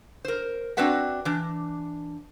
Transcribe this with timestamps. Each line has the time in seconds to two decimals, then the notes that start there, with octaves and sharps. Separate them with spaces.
0.25 A#4 C5
0.77 C4 D4 F#4 B4 E5 F#5
1.25 E3 D4